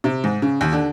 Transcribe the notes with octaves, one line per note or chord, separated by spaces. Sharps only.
C3
G#2
C#3
D#2
D3